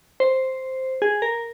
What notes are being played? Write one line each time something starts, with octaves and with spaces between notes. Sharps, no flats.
C5
G#4
A#4